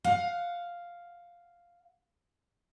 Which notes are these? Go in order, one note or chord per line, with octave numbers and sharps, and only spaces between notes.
F5 F#5